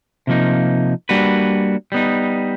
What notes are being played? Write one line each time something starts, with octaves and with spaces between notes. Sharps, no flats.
C3 F3 A#3 D#4
G3 A#3 D4 F#4 B4
G3 B3 D#4